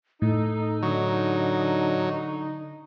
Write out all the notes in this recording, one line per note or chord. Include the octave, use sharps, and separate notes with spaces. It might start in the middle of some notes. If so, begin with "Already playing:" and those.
A2 D#4 A4
D3 F#3